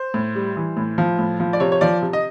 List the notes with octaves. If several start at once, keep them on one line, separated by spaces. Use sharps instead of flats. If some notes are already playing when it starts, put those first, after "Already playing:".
Already playing: C5
A2
G3
E3
A2
F3
A2
F3
D5
C3 C#5
C#5
F3 D5
C3
D#5